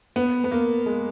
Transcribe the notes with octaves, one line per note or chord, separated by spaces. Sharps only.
B3
B3
A#3
G#3